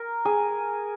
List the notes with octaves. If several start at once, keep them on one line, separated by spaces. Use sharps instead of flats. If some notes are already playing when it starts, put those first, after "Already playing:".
Already playing: A#4
G#4